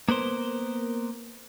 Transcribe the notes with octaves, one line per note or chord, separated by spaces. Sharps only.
A#3 B3 A#4 C5